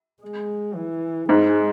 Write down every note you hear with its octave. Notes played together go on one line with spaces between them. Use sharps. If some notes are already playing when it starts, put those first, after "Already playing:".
G#3
E3
G#2 G#3